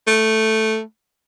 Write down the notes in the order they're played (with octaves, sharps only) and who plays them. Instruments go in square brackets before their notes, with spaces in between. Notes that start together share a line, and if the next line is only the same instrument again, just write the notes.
[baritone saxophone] A3